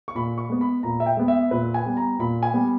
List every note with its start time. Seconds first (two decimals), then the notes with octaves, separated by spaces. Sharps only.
0.08 C#6
0.15 A#2 B5
0.38 C#6
0.50 G#3 B3
0.61 B5
0.83 A#2 A#5
1.00 E5
1.06 G5
1.17 G#3 B3
1.28 E5
1.51 A#2 B4
1.74 G#5
1.86 G3 B3
1.97 A#5
2.19 A#2 B5
2.43 G#5
2.54 G3 B3